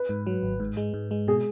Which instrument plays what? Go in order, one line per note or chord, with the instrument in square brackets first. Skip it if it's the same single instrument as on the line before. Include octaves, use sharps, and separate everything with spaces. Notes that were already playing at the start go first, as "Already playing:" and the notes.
Already playing: [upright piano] B4
[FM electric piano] G#2
F#3
G#1
G#2
G#3
G#2
G#3
[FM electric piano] B2 [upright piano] G#4